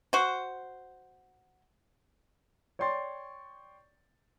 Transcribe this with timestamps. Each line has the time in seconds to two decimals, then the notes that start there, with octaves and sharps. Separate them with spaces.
0.13 F#4 C5
2.79 C#5 D5 G5 C6 C#6 A6